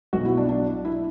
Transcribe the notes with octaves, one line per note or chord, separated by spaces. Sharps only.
B1 B2 F#4
E4
D4
D4
E4